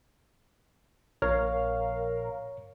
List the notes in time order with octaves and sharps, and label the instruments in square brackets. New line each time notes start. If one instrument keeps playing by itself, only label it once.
[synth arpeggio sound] A#1 A#4 F5 [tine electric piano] C#5